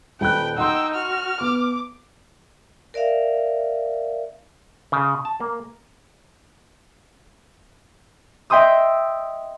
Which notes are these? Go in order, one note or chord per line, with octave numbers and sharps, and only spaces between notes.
D#1 B4 G5 F#6
D#4 F#5 G5 C6 E6
F#4 F6
B3 D6
A#4 D5 E5 F5
C#3
A5
A#3
D#5 E5 G5 C6 D#6 E6